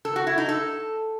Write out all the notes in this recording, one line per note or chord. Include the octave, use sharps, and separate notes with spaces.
A4
F#4
E4
D#4
A4